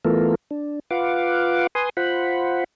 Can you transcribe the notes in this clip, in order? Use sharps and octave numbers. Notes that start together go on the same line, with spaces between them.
E3 A3 B3 F4 A4 A#4
D4
F4 B4 F5 F#5 D6
B4 G#5 C6 D#6
F4 C5 F#5 B5